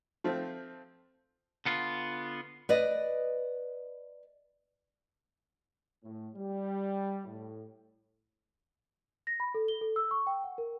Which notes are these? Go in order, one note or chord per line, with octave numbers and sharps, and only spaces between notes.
F3 A3 C4
D3 B3 F4
B4 D5 D#5
A2
G3
A2
A#6
B5
A4
G7
A4
E6
C#6
G5
F#5
A#4